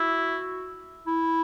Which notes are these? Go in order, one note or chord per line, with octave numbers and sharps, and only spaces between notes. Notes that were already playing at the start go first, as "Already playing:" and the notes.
Already playing: E4 F#4
E4